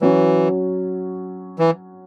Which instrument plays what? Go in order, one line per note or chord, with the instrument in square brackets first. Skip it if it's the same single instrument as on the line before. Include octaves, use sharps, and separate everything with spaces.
[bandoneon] E3 [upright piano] F#3 C#4 F#4
[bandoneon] E3